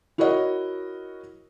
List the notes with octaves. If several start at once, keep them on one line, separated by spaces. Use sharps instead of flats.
E4 F#4 A#4 C#5 D#5 F#5